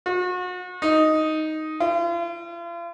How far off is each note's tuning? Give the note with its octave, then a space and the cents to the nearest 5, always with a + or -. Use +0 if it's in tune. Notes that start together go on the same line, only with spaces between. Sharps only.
F#4 -35
D#4 +5
F4 -40